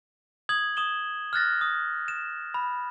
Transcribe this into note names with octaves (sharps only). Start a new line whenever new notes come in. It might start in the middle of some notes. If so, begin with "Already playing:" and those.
D#6 G#6 F#7
D#6 E7 G7
F6 F#6 A6 A#6
D#6
E7
B5